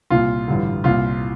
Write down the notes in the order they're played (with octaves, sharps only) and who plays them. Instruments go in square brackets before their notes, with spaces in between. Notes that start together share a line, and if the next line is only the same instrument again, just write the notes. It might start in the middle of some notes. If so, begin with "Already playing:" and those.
[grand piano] C2 A#2 F4
A1 G2 D3
C2 A#2 F4